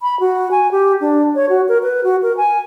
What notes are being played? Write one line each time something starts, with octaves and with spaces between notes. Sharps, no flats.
B5
F#4
G#5
G4
D4
C#5
F#4
A#4
B4
F#4
A#4
G#5